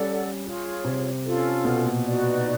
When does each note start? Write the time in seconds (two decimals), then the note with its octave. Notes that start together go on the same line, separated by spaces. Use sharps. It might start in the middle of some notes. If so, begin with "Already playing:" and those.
Already playing: G3 C#4 A4 D5 F#5
0.44 F4 G#4 C#5
0.84 C3
1.24 C#4 F4 A4
1.65 B2
1.85 A#2
2.05 D#4 F#4 B4 D5